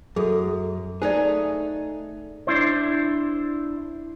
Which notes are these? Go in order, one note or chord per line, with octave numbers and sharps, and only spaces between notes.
F#2 G#4 A4
A3 D#4 G#4 C5 D5
D4 E4 C5